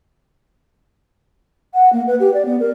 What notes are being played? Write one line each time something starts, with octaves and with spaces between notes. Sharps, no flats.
F#5
A#3
B4
G4
D5
B3
A#4